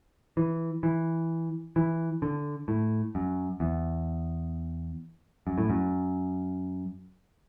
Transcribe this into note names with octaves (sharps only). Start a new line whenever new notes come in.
E3
E3
E3
D3
A2
F#2
E2
F#2
A2
F#2